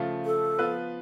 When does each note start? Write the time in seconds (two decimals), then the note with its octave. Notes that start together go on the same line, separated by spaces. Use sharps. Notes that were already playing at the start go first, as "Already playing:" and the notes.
Already playing: C#3 F3 A3 F4
0.25 A4
0.58 F3 B3 F4 B4